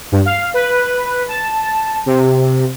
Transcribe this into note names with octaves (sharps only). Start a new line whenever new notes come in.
G2
F5
B4
A5
C3